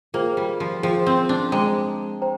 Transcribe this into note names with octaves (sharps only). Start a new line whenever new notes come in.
A#3 F4 G#4 C5 G5
G3
F3
F3 F4 G#4 C5 G5
C4
D4
G#3 C5 G5 A#5 D6
C5 G5 A#5